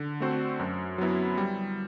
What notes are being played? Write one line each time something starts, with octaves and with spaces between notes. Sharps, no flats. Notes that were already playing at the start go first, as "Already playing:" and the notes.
Already playing: D3
A3 C4 F#4 C5
F#2
F#3 B3 E4
G3